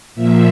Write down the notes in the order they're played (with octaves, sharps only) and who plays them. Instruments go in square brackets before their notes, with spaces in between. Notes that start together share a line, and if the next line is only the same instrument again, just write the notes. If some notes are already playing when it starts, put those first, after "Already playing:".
[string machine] A#2 F3 A#3 E5